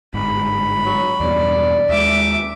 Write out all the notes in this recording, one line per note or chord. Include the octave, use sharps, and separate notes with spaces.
G1 G#2 B5
F#3
E2 G2 B2 D5
D#2 G#3 E5 D6